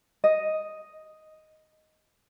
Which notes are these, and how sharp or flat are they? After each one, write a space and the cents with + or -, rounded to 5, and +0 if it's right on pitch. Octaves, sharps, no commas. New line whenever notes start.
D#5 +0